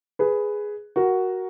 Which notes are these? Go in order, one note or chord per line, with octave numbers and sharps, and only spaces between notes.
G#4 B4
F#4 A#4